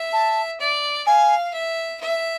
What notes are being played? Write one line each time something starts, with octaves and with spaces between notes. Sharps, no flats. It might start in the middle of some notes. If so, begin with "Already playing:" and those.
Already playing: E5
A5
D5
F5 G#5
E5
E5